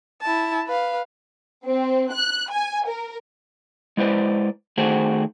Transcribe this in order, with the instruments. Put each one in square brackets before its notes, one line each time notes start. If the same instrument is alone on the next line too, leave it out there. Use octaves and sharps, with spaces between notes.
[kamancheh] E4 A5
B4 F5
[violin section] C4
F#6
G#5
A#4
[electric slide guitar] G#3 E4 B4 C5 D5
D#3 A3 C4 F#4 G#4 C5